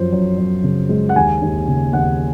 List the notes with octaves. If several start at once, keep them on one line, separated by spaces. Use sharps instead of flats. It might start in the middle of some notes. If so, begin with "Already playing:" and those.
Already playing: F#2 F3 C5
F#2
F#2
C#3
G#3
F#5
D#2 G#5
D#2
C#3
D#2 F#5